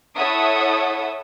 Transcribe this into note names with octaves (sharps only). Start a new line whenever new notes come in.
E4 A4 C#5 E5 F#5 D#6